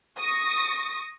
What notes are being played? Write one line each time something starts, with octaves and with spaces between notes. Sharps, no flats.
C#6 D#6 A#6